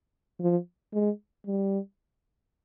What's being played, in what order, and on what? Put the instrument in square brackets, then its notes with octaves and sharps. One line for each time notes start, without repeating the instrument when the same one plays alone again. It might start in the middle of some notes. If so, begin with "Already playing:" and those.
[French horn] F3
G#3
G3